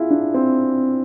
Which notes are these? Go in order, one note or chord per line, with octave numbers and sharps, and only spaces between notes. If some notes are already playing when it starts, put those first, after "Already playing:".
Already playing: E4 F4 G#4
D4
C4